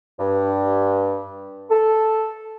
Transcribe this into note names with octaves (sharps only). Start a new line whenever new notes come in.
G2
A4